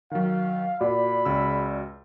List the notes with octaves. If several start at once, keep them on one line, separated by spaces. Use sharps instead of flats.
D#3 F#3 F5
A#2 F#4 D5 B5
C#2 C#3 E6